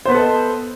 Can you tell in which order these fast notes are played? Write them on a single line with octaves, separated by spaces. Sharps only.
C5 B3 B4 A4 D#5